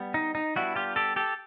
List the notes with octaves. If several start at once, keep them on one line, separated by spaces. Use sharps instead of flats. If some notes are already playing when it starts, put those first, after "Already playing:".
Already playing: G3 B3
D#4
D#4
G3 B3 D4 E4 F#4
F4 G4
G4 A4
G4 A4